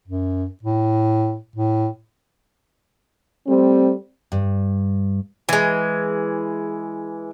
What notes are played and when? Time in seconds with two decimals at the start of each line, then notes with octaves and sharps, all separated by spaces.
0.08 F#2
0.63 A2
1.56 A2
3.47 G3 A3 C4
4.32 G2
5.49 E3 G#3